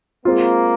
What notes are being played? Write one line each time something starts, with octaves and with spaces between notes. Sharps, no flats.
G#3 A#3 C4 F4